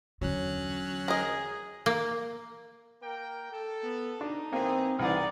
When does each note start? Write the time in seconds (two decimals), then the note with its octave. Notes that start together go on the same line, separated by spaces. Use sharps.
0.21 E2 D3 F#3 C#4 F#6
1.08 G#4 A#4 D#5
1.86 A#3
3.03 A#3 A#4 G5
3.52 A4
3.82 B3
4.21 D4 D#4
4.53 G#2 E3 A#3 C4 G#4
4.99 C2 E3 D#4 G#4 D5 F#5